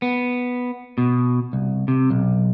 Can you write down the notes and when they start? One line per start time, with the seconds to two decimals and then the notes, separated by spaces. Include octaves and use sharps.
0.02 B3
0.98 B2
1.53 C2
1.88 C3
2.10 B1